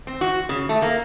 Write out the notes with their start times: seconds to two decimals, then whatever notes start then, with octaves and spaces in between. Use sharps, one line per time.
0.07 C4
0.21 F#4
0.49 C#3
0.69 A3
0.82 A#3